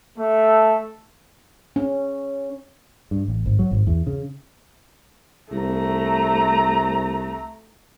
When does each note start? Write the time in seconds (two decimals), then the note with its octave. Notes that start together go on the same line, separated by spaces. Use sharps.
0.19 A3
1.76 C#4
3.11 G2
3.28 A1
3.46 G#1
3.59 F#3
3.71 G#1
3.87 E2
4.07 C#3
5.52 C2 A3 A#5